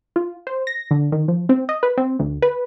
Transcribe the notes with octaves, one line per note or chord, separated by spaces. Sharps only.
F4
C5
A#6
D3
D#3
F3
C4
D#5
B4
C4
D2
B4